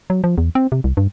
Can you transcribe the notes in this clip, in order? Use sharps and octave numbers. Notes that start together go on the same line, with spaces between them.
F#3
F3
E2
C4
C3
C2
G2